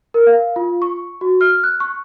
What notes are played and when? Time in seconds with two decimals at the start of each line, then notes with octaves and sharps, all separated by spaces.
0.14 A#4
0.27 F5
0.56 F4
0.82 C#6
1.21 F#4
1.41 F6
1.64 F#6
1.80 C#6